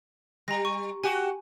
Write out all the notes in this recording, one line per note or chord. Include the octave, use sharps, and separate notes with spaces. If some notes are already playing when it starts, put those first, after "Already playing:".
G3 A#5 A#6
C#6 D#7
F#4 G4 G#5